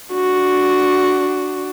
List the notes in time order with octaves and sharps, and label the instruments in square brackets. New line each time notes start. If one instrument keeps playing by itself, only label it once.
[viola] D4 F#4